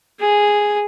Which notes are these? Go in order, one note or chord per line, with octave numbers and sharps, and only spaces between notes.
G#4